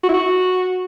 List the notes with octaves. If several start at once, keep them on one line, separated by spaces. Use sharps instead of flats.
F#4
E4
F#4